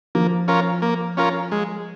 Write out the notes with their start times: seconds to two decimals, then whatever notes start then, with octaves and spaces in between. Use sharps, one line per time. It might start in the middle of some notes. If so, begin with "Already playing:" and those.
0.15 F3 A#3
0.48 C#4 F4 A#4
0.82 A#3
1.17 C#4 F4 A#4
1.52 G#3